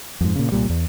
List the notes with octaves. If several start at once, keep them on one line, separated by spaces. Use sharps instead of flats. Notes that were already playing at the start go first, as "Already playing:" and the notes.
F2 G#2
A#2 C#3
C2 A#2 G3
E2